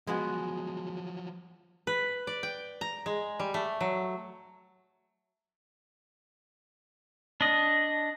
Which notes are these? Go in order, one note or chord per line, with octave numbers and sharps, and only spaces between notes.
F3 F#3 G#3 B3 F#4
B4
D5
G5
A#5
G#3
G3
A3
F#3
D4 D#5